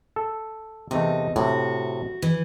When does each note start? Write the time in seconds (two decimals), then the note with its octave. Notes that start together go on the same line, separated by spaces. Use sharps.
0.16 A4
0.91 E2 C3 A3 D#4
1.36 A2 C3 F#4
2.22 E3